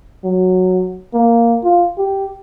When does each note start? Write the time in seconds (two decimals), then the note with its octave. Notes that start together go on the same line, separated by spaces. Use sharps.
0.24 F#3
1.14 A#3
1.63 F4
1.98 G4